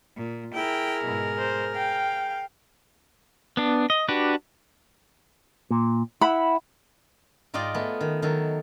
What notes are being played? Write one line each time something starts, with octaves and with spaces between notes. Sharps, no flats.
A#2
E4 G#4 A#4 G5
G#2 B2
C5
F5 G5
B3 D4
D#5
D4 F#4 G4 B4
A#2
E4 F#5 B5
G#2 F4 D5 D#5 G5 C6
A3 B3 G#4
D#3
D#3 F#3 A4